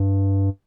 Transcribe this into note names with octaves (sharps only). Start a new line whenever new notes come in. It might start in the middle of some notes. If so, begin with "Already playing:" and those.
Already playing: G2